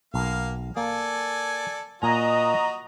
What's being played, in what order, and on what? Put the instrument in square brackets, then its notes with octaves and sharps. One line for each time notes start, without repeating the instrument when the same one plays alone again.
[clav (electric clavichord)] B1 [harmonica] A#3 F5
[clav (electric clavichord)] A#3 [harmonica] A4 D5 G#5
[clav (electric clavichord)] A#2 G#5 [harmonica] F#4 [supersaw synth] D#5 A#5